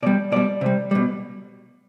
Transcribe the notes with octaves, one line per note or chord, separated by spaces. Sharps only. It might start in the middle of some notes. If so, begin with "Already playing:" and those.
B2 G3 D5
B2 G3 D5
C3 G3
B2 G3